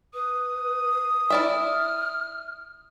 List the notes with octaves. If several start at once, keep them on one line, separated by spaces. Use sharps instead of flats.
B4 D#6
E4 D5 E5 F6